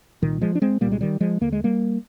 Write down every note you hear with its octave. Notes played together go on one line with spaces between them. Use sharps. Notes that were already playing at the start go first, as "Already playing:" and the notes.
C2 A#2 D#3
F3 G#3
D4
G#3 C4
C2 A#2 G3 A#3
G#3
D#3 G3
F3 G#3
D#2 D3 A#3
G#3
G3 A#3